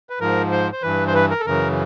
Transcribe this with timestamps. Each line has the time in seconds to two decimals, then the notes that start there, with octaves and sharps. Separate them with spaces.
0.10 B4
0.20 G#2 F3 A#4
0.51 C5
0.72 C5
0.82 G2 E3 B4
1.07 C5
1.14 B4
1.30 A#4
1.40 A4
1.46 F#2 C#3 E3 A#4